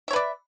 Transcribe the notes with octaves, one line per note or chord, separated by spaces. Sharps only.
B4 C#5 D5 E5